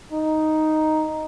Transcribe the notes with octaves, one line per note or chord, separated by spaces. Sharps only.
D#4